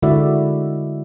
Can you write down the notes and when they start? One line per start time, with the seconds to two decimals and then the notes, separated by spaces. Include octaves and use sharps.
0.02 D3 G#3 E4 F#4 D5 E5